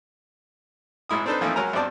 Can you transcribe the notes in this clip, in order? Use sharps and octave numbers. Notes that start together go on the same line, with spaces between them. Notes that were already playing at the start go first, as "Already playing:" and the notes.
G#1 G#2 E4 D#6
C4 D4 D#4 A4 B4 C5
E3 F3 A3 A#3 C4 D#4
C#2 F#3 A#4 G#5 A#5
B1 G2 C4 D5 A5